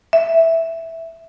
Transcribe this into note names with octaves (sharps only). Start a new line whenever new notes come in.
E5